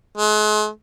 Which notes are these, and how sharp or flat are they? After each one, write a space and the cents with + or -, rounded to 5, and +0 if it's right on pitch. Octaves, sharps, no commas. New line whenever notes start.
G#3 +40